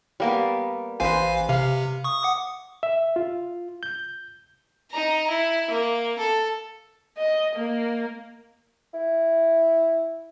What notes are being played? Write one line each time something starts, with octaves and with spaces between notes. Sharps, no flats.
G3 A#3 B3
A1 B4 C5 F5 G#5
C3 F5
C#6 D#6
F#5 D6 D#6
E5
F4
G6
D#4 A#5
E4
A#3
A4
D#5
A#3
E4